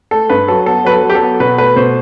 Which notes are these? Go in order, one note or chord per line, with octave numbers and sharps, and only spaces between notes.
A3 A4
G2 B4
F#3 A4
B3 A4
F#3 B4
A4
F#3
G4
A4
B3
B2 B4
A3 B4
B2 C5